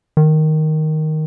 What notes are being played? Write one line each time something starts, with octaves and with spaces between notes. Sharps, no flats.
D#3